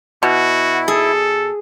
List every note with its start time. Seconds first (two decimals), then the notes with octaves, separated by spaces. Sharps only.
0.23 B2 E4 F#4
0.88 G#4 A4